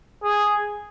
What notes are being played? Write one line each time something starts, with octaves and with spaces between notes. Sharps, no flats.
G#4